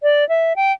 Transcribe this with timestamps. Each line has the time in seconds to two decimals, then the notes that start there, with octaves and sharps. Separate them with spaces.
0.03 D5
0.29 E5
0.56 G5